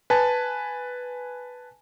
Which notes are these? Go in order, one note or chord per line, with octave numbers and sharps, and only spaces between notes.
B4 G#5 A5